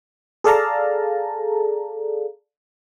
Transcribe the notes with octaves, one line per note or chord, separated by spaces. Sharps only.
G#4 A4 D5 F5 A5 A#5